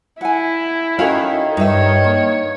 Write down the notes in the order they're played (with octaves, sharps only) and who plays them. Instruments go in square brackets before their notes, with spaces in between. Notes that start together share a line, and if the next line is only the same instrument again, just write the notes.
[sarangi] E4 [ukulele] F#5 G#5
[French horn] D#3 [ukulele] C#4 F#4 F5 [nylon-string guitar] A4 C#5
[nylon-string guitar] G2 G3 [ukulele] D#4 E5 [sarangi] C#5
[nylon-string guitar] A#3